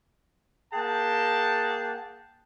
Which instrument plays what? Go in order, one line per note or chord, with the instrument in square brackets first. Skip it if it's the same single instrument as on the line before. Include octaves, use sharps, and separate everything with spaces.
[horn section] A#3 G#4 F#5 G5 A5